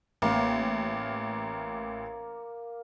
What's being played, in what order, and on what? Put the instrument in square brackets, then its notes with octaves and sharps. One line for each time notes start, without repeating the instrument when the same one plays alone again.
[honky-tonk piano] A1 [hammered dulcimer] A#3